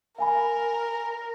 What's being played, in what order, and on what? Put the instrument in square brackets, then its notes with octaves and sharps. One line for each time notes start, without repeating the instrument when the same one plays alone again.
[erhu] A#4 [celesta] F5 G#5 B5